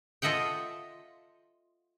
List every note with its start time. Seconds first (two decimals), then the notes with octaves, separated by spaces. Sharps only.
0.22 F4 A4 D#5 E5 F#5 G5